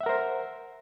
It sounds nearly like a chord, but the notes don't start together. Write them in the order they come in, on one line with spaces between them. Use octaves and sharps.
E5 F#5 A#4 C5